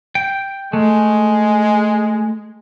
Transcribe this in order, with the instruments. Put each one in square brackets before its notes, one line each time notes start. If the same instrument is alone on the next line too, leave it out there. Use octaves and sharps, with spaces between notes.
[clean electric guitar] G5
[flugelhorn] G#3 [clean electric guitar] A3